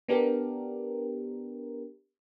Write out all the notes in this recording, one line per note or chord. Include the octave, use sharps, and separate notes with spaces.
B3 D4 G4 A#4